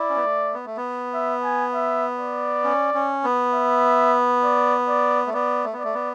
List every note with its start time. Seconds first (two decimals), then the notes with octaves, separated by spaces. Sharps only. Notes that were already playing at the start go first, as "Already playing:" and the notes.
Already playing: E4 D5
0.10 C#4
0.16 B3
0.24 A3
0.54 B3
0.66 A3
0.77 B3
1.14 E5
1.44 G#5
1.74 E5
2.19 D5
2.64 C#4
2.94 C#4
3.24 B3
3.54 E5
4.44 D5
4.89 D5
5.27 A3
5.33 B3 D5
5.64 A3
5.73 B3
5.79 D5
5.84 A3
5.94 B3